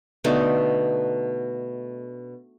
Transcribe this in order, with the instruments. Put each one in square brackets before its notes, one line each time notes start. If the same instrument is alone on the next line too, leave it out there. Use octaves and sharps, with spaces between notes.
[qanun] B2 D3 A3 D#4